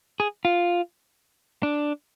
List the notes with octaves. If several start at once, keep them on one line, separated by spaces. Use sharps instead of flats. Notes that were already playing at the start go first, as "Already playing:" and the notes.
G#4
F4
D4